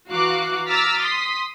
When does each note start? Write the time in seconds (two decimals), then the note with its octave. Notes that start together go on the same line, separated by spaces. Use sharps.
0.11 E3 F#4 F5 A#5 D6 F#6
0.69 A#5 D6 E6 F6 A6 B6
1.00 C6 D#6 B6